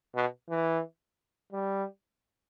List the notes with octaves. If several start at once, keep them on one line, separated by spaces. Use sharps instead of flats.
B2
E3
G3